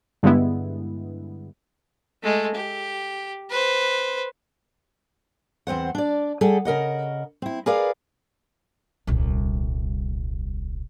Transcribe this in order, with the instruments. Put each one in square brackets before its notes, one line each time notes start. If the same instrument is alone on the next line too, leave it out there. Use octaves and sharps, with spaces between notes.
[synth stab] G2 D3 G#3 B3 E4
[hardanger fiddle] G#3 A3
G4
B4 C5
[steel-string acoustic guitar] E2 C4 C5 F#5
D4 D5
G3 G#4 A4 F#5
C#3 A#4 D#5 F#5
C4 E4
G#4 A#4 B4 D5 F5
[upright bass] D#1 C2